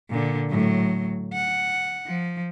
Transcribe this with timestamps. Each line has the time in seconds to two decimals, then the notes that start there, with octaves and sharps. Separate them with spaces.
0.11 A#2 D3
0.50 A2 F#3
1.33 F#5
2.07 F3